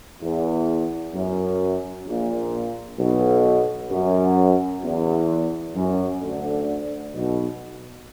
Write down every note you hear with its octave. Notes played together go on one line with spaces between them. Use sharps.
E2
F#2
A#1 A#2
B1 B2
F#2
E2
F#2
D2 D3
B1 B2